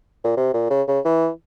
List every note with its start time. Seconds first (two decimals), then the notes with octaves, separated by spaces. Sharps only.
0.24 A#2
0.37 C3
0.54 A#2
0.70 C#3
0.87 C#3
1.05 E3